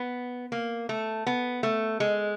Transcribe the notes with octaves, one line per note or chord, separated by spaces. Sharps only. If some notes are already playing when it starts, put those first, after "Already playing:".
Already playing: B3
A#3
A3
B3
A3
G#3